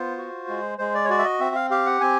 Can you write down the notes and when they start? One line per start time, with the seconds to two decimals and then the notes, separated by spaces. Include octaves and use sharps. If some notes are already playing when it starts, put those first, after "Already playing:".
Already playing: B3 F4 C5
0.18 F#4
0.48 G#3
0.78 G#3 C5
0.94 D5
1.05 C#5
1.10 F#4 D5
1.19 E5
1.24 D#5
1.40 C4 E5
1.55 F5
1.71 G4 F5
1.86 F#5
2.01 C4 G#5